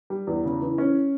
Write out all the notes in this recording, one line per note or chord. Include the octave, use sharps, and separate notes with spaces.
G3
E2
C#3
E3
C#4